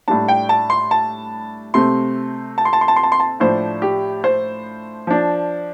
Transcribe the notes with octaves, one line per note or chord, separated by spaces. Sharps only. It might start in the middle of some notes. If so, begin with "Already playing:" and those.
A2 G3 D4 A5
G5
A5
C6
A5
C3 A3 C4 C6
A5
C6
A5
C6
A5
C6
A5
C6
A5
A2 F3 D4 C5
G4
C5
F3 D4